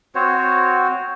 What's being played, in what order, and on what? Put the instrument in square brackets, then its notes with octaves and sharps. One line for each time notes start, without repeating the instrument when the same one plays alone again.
[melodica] C4 F#4 C5 C#5